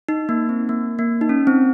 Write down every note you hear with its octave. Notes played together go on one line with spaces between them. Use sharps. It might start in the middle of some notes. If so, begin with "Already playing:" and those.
D#4
A#3
C4
A#3
A#3
D#4
C#4
C4